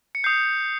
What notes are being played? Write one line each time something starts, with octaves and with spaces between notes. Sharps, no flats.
C#7
D#6 G6 C7